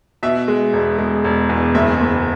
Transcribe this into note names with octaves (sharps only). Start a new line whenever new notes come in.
B2 E5
G#3
E1
G#3
E1
E2
F#1 E5
F#1